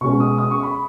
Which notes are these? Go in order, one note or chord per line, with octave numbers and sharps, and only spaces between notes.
B2 G#3 C#4 C#6
D#6
D#6
C#6
B5